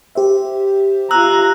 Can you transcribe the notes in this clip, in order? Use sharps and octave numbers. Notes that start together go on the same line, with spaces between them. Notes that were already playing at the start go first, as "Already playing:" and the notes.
G4 C5 E5
F4 A#5 E6 F#6